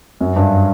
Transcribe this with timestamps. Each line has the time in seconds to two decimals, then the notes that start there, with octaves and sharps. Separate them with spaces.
0.21 F#2
0.36 G2